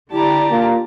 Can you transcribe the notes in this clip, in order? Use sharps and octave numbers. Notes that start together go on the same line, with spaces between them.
D3 E4 G4 D5 A5 A#5
A#3 F4